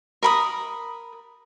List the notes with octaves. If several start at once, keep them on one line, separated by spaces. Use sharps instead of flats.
A#4 B5 D#6